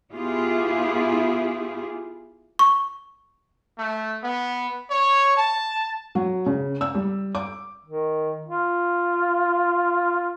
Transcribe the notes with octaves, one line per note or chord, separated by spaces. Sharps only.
B3 E4 F4 G4 G#4
C#6
A3
B3
C#5
A5
F#3
C#3
E6
G3
D6
D#3
F4